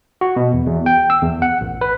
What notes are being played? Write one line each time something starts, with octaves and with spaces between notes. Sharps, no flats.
F#4
B2
E2
E2
G5
E6
E2
F#5
A1
B4